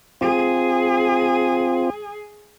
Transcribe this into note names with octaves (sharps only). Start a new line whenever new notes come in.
C4 F4 G#4